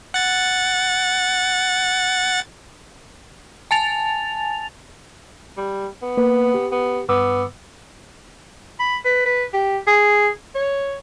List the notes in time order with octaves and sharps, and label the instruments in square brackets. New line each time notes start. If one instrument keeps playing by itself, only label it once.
[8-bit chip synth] F#5 A6
[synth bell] G#5 A5 A6 F7
[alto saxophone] G3
B3
[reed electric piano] A#3 B4
G4
[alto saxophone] B3
[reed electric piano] G2 D6 E6 [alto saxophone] B3
[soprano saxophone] B5
B4
B4
G4
G#4
C#5